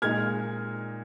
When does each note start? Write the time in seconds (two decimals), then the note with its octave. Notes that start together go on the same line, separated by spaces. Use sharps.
0.02 A#2 G#3 D#4 F6 G#6